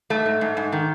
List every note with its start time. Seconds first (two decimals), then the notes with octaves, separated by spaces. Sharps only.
0.10 G#2 A3
0.26 G#2
0.41 G#2
0.57 G#2
0.72 D#3